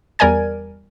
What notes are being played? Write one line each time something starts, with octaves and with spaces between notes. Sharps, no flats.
E2 G3 A#4 D5 G#5 G#6